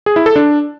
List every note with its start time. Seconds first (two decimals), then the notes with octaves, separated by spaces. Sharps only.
0.06 G#4
0.16 E4
0.26 A4
0.36 D4